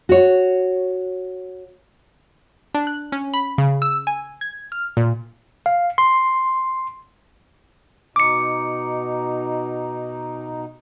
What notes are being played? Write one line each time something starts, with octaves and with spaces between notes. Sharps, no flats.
F#4 C#5
D4
F#6
C#4
B5
C#3
E6
G#5
G#6
F6
A#2
F5
C6
B2 D#4 D6 C#7